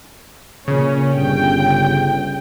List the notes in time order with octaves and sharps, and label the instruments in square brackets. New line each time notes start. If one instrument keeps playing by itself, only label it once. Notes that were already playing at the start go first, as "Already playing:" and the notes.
[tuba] A#2 [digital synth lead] C#3 [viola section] C#4
[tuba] G1 [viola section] G5